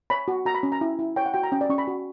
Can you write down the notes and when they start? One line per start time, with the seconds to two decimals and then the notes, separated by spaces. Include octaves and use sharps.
0.10 C#5 B5
0.28 F#4
0.45 F#4 A#5
0.55 B5
0.63 C#4
0.72 A#5
0.81 E4
0.99 E4
1.16 C#5 G5
1.26 F#5
1.34 F#4 G5
1.43 A#5
1.52 C#4 G5
1.61 D5
1.70 C#4 C#6
1.78 B5
1.87 F#4